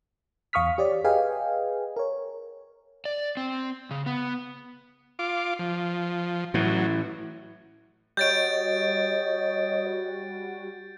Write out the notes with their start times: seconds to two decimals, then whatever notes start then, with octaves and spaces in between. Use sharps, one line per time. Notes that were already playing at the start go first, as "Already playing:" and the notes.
0.53 E2 F5 C#6 D#6 F6 B6
0.78 G4 C#5 D5
1.04 G#4 B4 D#5 F5 G5 G#5
1.96 A#4 C#5
3.05 D5
3.37 C4
3.91 C#3
4.06 B3
5.19 F4 D6
5.59 F3
6.54 A2 E3 F#3
8.17 G3 F#4 C#5 D#5 G6 A6 D7